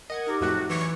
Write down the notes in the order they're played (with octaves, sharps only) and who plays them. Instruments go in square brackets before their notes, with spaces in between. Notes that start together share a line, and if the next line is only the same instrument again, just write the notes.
[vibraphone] A#4 [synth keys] D#5 F#5 G#6
[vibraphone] D#4 G4 D6 [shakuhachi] A#4
[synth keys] F2 A2 A3 [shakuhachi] F#4
[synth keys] F#3
[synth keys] E3 [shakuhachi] C#6